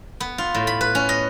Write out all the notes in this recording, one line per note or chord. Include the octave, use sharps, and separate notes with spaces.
B3
F4
A2
B5
B4
C#4
D#5